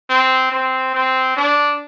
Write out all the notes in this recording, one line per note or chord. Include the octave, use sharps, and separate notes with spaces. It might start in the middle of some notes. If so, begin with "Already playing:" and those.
C4
C4
C4
D4